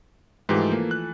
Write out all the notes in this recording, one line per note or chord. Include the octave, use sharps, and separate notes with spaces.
G#2 E3 F3 A3 G4
A#3
F#6